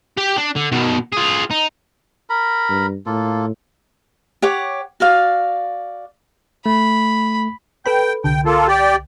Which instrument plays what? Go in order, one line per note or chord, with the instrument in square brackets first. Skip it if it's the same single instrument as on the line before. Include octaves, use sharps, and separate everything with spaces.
[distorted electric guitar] G4 G5
D4
D3
B2 D#3
F4 G#4
D#4
[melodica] A#4 A#5 B5
[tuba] G2
[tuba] A2 [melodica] A#3 F4 A4
[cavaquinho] G4 C#5 F#5 D6
F#4 D5 F5
[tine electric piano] A3 [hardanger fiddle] B5
[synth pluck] A4 B4 B5 [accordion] G5
[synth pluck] C2 D3 [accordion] G5
[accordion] A#3 F4 A4
G4 D5 G5